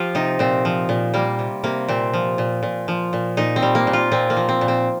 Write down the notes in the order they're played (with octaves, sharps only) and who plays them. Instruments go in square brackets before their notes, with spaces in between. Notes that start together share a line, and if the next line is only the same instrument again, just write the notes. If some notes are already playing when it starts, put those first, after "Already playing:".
Already playing: [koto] F3 F4 G4
C3 D#4
A#2 C4
F3
A#2
G3 A#3
C3
C3 A#3
A#2 C4
F3
A#2
A#2
F3
A#2
A#2 D#4
C4
G3
A#3
A#2
F4
A#2 C4
A#3
F3
C4
A#2
C4